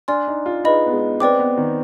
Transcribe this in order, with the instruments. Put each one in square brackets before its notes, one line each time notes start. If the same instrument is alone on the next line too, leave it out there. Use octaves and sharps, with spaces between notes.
[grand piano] D4 [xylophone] D5 G#5 C6 F6
[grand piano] D#4
F4
[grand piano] D#4 [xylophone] G#4 B4 D#5 B5
[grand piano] B3
G#3
[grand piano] C4 [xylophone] B4 D5 G5 D6
[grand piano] B3
D#3